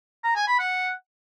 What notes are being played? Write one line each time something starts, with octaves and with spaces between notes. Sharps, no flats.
A#5
G#5
B5
F#5